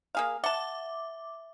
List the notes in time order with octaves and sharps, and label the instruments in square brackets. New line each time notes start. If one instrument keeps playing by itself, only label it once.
[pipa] A#3 G#4 F5
[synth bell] E5 D6 [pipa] F#5 A5